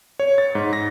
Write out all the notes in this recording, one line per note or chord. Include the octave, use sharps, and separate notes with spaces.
C#5
A6
G#2
A#6